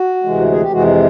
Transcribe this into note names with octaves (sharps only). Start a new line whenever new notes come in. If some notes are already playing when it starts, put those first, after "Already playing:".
Already playing: F#4
D2 C3 E3 G#3
G#4
G4
F2 C3 E3 G#3 F#4